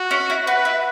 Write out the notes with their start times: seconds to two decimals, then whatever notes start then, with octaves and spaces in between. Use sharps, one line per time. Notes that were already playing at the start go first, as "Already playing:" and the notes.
Already playing: F#4
0.11 C#4
0.30 E4
0.47 F#4 B4
0.65 E4